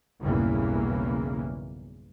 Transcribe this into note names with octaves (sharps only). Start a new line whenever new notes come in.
B1 E2 G2 C#3 E3 A#3